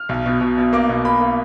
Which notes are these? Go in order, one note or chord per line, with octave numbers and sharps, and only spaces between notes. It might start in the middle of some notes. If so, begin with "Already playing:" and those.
Already playing: F6
B1
B2
B2
B2
A#3 D6
B2
A#3 B5
A#3